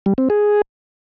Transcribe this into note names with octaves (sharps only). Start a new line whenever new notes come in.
G3
C4
G#4